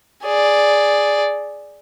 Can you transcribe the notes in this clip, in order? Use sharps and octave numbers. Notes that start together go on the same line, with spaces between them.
G#4 D5